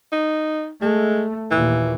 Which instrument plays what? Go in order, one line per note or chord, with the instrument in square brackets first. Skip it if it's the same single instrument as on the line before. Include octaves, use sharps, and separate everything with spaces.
[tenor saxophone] D#4
[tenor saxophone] G#3 [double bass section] A3
[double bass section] D#2 A#2 [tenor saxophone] E3